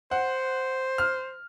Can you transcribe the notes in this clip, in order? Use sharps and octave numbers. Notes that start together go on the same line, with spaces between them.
C5 F#5
F6